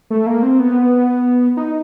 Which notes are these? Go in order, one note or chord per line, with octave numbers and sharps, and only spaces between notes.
A3
A#3
C4
B3
D#4